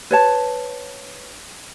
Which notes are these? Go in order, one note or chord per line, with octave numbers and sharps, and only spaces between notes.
B4 C#5 A5